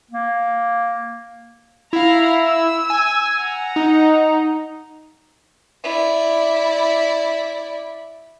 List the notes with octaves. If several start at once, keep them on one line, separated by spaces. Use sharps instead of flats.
A#3
E4 F5 A#5
E6
G#5
F#5 A#5
D#4
E4 D5